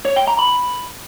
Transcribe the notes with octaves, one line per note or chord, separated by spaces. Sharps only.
C#5
G5
A#5
B5